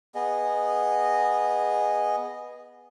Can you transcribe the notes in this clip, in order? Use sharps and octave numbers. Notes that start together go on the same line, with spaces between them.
B3 G#4 D#5